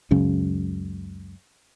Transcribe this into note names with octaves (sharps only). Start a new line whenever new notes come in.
C#2 F#2 C#3